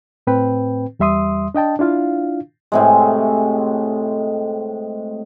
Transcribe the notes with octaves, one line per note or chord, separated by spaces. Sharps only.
A2 C4 B4 G5
E2 G3 E5 C6 D#6
D4 D#5 G5 A5
D4 E4 F4 F5
A2 C3 G#3